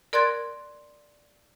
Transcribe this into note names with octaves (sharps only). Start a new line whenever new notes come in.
A#4 D5 C6 F#6 G#6 A6